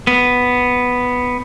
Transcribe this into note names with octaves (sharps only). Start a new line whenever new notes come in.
B3